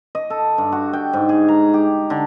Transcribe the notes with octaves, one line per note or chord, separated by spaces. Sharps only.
D#5
A4
G2
F#4
G5
G#2
G#4
A#5
G4
D3